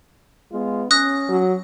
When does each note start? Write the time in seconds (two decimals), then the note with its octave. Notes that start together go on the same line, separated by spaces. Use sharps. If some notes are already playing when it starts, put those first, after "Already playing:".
0.52 G#3 B3 F4
0.91 C#4 D#6 F#6 A#6
1.29 F#3